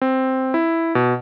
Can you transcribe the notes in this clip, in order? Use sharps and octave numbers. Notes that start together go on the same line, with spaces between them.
C4
E4
B2